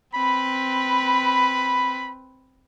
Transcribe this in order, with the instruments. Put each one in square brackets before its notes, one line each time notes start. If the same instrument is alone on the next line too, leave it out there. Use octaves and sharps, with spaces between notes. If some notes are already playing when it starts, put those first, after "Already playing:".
[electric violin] C4 B4 [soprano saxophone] B5